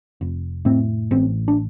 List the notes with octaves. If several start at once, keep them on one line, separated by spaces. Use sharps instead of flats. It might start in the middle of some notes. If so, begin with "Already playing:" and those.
F1
A2 C4
A1 C4
D4